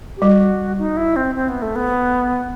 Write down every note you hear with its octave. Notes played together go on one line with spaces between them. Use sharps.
G4
G3 F#4
D#4
E4
C4
C4
B3
A3
B3